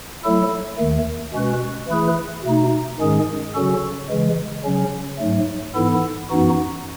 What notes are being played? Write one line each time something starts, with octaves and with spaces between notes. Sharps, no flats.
F#3 A3 E4 A4
D#2 D#3 A3
B2 G#3 C#4 F#4 B4
E3 A3 E4 G#4 B4
B2 A3 D#4
G#2 D#3 G#3 C#4 G#4
C#3 F#3 C#4 F#4 A4
C#3 E3 G#3
C#3 F#3 C#4
G#2 F#3 A3
G#2 E3 B3 E4 A4
F#2 E3 B3 D#4 F#4